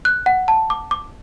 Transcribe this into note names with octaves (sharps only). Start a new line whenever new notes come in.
F#6
F#5
A5
D6
D6